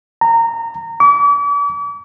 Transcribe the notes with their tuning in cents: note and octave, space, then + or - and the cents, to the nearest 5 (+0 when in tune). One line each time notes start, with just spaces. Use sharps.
A#5 -20
D6 -40